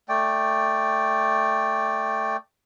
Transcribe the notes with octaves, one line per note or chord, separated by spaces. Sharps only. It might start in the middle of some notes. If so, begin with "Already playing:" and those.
A3 D5 G5